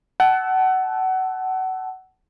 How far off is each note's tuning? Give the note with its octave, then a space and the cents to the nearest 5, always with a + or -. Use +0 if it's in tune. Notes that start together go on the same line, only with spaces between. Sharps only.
F#5 +25 A5 -20 E6 +0